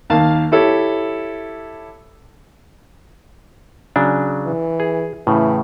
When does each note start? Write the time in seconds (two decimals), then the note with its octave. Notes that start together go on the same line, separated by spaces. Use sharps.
0.10 D#2 A#3 F5 A5
0.52 E4 G4 A4 C#5
3.96 C#3 F#3 D4
4.46 E3
4.80 G#4
5.27 A2 C#3 E3